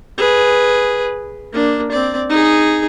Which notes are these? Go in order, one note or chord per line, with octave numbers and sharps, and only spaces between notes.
G#4 B4
A#3 D4
C4 D5
D#4 G#4